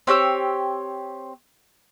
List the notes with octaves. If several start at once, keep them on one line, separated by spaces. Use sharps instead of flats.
C4 G4 C#5 E6